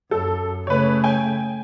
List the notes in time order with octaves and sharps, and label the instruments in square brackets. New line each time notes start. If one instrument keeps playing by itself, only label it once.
[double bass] F#2 [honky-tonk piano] A4
[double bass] C#3 A3 [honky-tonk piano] B4 C#5
[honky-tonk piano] G5 G#5